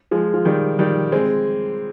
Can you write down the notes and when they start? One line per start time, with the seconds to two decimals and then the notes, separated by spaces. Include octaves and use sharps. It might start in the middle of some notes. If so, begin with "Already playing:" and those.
0.11 F3 G#3
0.34 F3
0.45 D#3 G3
0.79 D#3 G3
1.12 G#3 C4